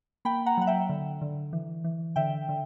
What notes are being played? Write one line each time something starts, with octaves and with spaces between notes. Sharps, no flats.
A#3 G5 B5
F#5 A#5
F#3 F#5
E5 G5
D3
D3
E3
E3
D3 E5 G5
D3